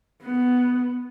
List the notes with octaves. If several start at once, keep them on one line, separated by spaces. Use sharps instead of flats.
B3